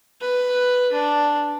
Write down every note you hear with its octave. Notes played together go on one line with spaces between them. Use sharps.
B4
D4